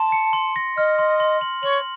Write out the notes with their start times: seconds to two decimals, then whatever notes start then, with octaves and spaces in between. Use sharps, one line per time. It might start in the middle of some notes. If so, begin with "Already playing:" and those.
Already playing: A5 C6
0.12 C#7
0.33 C6
0.56 A#6
0.77 D#5 F6
0.99 C6
1.20 C6
1.41 F#7
1.63 C#5 F#7